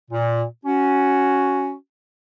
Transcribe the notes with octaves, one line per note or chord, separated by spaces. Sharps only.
A#2
C#4 F#4